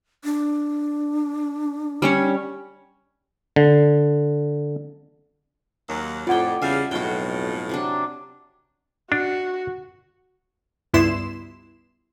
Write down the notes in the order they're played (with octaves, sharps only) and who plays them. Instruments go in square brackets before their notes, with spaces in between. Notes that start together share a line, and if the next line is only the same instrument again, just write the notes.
[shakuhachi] D4
[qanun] G3 C#4 C#5
[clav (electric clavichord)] D3
[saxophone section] D#2 F#3
[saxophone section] F2 [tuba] A2 [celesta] F4 F#5 [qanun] D5 G5
[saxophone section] E2 G3 F5 [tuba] C#3 [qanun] E5 G#5
[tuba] B1 [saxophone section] F2 A2 G#3 [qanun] F#4 G5
[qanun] C3 F#3 D4
[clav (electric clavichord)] D4 [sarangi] F#4
[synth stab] C#2 G2 B3 E4 C6 E7